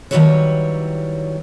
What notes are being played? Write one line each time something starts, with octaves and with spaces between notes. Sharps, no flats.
D#3 F#3 G3 E4 B4 C#5